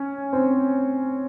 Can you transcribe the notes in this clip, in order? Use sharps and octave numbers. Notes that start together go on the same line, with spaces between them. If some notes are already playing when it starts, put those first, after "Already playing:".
Already playing: C#4
C4